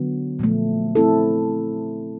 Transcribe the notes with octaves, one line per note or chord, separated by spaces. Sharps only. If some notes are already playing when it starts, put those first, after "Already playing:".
Already playing: D3 F#3 B3
A#2 F3 A3
A3 C4 E4 A4